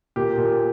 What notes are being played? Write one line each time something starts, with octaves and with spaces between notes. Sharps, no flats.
A#2 G4
A#2